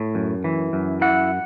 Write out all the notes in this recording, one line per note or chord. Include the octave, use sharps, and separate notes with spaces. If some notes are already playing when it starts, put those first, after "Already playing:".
Already playing: A2
F#2
E3
F#2
E4 F#5